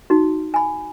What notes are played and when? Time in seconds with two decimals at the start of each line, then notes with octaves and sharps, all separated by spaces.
0.10 D#4 F#4
0.54 G#5 B5